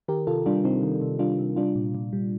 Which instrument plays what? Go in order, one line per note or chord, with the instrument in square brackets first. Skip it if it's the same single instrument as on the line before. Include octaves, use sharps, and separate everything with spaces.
[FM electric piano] D#3 G4 A#4
C3 F4 A4
G3 D4 F4
C3 C4 D#4
D#3
C3
G3 D4 F4
C3
G3 D4 F4
A#2
A#2
G3